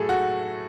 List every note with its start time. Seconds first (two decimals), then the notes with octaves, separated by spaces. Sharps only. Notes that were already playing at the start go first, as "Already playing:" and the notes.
Already playing: A2 F#3 A3 G#4 A4
0.09 F#4